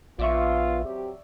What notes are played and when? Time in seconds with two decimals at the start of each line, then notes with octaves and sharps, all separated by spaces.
0.19 A#1 B3 F4 D5 E5 C#6
0.84 F#3 C4 G4